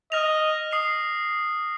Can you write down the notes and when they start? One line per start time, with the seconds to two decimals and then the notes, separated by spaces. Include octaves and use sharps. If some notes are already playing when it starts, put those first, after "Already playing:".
0.12 D#5 F6 A#6 F7
0.71 D#6 C7 F7